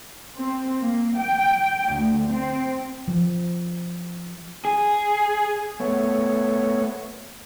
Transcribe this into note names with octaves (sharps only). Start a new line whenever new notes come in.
C4
A#3
G5
D2
C4
F3
G#4
A3 B3 C#5